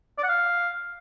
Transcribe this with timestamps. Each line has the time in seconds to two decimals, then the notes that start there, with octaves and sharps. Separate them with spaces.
0.18 D5
0.24 F#5
0.29 F5